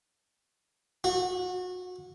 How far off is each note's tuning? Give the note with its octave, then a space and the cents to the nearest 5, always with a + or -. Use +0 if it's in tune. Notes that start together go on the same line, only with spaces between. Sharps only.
F#4 -30